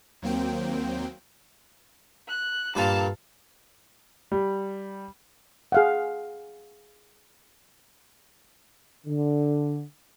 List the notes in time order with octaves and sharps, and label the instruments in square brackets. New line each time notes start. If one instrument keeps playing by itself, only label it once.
[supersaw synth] D#2 F#3 A#3 C4 G5
[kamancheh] F#6
[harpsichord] G2 A#2 A4 [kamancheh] F5 A5
[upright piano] G3
[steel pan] G#4 F5 F#5
[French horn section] D3